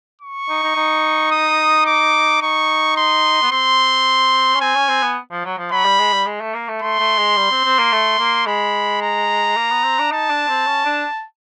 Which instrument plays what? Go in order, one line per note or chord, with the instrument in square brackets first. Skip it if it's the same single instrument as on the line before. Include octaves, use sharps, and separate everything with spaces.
[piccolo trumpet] C#6
[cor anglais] D#4
D#4
D#4
[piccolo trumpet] D#6
D6
[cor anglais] D#4 [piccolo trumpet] C#6
[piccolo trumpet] C6
[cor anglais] B3
[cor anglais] C4 [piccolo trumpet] C6
[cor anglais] C#4
[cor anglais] C4 [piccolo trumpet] G#5
[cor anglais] C#4
C4
B3
F3
F#3
F3
[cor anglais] F#3 [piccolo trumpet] B5
[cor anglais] G3
G#3
G3
G#3
A3
A#3
A3
[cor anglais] A3 [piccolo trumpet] C6
[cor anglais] A3
G#3
G3
C4
C4
A#3
A3
A#3
[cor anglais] G#3 [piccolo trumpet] B5
[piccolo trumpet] A#5
[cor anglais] A#3
B3
C4
D4
[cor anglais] D#4 [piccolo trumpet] A5
[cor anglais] D4
C4
C#4
D4